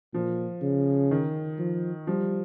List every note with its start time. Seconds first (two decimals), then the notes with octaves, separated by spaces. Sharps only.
0.14 A#2 F3
0.62 C#3
1.11 D#3
1.59 F3
2.07 F3 G3